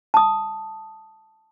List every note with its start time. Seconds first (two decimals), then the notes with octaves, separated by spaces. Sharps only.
0.14 A5 D#6